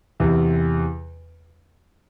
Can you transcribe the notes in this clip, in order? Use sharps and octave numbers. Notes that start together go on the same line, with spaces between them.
E2 C3 E3